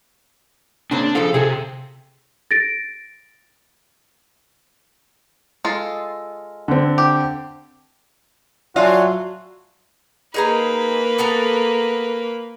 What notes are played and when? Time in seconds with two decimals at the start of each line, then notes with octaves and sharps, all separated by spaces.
0.91 C#3 A#3 C4 D4
1.15 C#3 F3 A4 F5
1.34 C3 G#4 A4
2.51 A6 A#6 D7
5.65 G#3 F4 A4
6.68 D3 C4
6.98 G4
8.76 F#3 F4 F#4 D5 E5 G#5 A5
10.34 A#3 D#4 G#4 B4 A#5
11.18 B3 A4 A#4